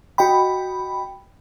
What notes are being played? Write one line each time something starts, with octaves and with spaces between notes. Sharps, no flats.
F#4 D#5 G5 B5